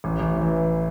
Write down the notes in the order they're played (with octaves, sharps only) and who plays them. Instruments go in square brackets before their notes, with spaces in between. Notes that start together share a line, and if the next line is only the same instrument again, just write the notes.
[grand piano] A1
A1
E3